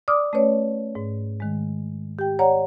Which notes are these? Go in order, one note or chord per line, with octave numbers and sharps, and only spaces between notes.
D5 D6 D#6 F6
A3 C#4 B4 C#5 D5
G#2
D#3 G#3
G4 G5
C#5 D5 F#5 A#5